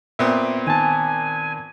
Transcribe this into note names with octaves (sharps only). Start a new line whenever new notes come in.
A#2 B3 C4 E5
D#3 G#5 A5